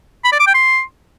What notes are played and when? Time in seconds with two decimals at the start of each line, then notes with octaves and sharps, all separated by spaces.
0.25 B5
0.32 D5
0.40 D6
0.47 G5
0.55 C6